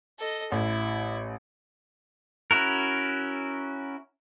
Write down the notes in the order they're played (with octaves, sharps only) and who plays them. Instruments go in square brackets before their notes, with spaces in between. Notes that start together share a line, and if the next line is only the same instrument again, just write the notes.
[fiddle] A4 D#5
[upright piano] A1 [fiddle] E4
[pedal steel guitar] C#4 E4 F#4 A#4